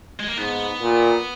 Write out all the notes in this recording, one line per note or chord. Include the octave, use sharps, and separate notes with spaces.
G#3
A#3
G#2 B3
A#2